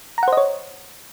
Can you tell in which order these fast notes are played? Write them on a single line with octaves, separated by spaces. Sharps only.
A#5 F#5 C5 D#5 C#5